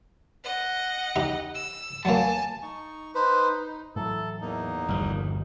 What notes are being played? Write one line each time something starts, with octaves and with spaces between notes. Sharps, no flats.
D#5 F#5
D#4 G4
E6
F#3 A#3 G#5 A5
D#4 C#6
D#4 B4 C5
D#4
A2 E3 F#3 A4
E2 A#3 D#4
G1 D#2 F3 G3